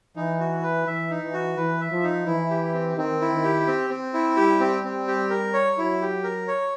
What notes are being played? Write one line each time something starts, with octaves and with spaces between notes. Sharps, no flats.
E3 D#4
F#4
B4
E3 E5
D#4
E3
F#4
E3 B4
E5
F3
D#4
E3 E4
G4
C4
D#3 C4
E4
D#3
G4
C4
C4
E4
G3 G4
C4
C4
G4
A#4
C#5
F#3 E4
G4
A#4
C#5